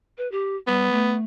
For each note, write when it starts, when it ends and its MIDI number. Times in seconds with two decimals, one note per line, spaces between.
0.18 0.30 71
0.31 0.56 67
0.67 0.89 55
0.67 1.15 59
0.92 1.24 57